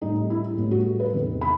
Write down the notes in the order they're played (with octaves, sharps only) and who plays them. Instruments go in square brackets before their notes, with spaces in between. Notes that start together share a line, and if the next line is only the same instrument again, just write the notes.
[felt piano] A2 G3 C4 D#4
E4
A2 G3 B3
F#4
B4
E2 C3 D#3
B5